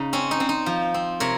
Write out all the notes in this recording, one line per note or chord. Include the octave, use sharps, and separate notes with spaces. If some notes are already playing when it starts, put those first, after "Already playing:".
Already playing: C#3 D#4
C4 C#4
D#4
C4
D#4
F3
C4
C3 A#4 C#5